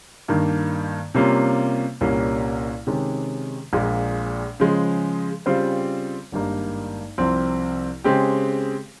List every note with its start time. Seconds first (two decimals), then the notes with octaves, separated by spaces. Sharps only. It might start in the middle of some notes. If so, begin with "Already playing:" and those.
0.28 G2 D#3 A#3
1.15 C3 G3 A#3 C#4 F4
2.01 C2 A#2 G3 A#3 C#4
2.87 C3 D#3 G#3 C#4 G4
3.73 A#1 A#2 G#3
4.60 C#3 F3 G#3
5.46 C#3 G3 C4 F4 C5
6.32 G#1 G2 G3 A#3 D#4
7.18 C2 C3 F3 C4
8.04 C#3 G#3 C4 G4